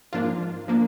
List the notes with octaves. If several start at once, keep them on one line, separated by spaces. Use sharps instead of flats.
G#2 F3 A#3 D4 F4
F3 A#3 D4